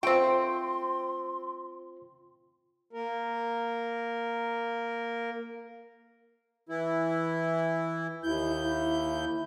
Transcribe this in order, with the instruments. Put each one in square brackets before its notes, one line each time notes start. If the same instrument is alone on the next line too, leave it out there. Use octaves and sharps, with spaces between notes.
[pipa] A3 C4 [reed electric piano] F4 C5 [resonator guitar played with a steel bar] G5 [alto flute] C6
[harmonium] A#3 A#4
[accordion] E3 E4
[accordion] D#2 G6 [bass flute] E4
[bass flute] E4